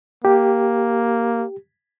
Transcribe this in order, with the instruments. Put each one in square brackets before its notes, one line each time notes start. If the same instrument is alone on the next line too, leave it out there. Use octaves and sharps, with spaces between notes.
[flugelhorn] A#3 [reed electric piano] G4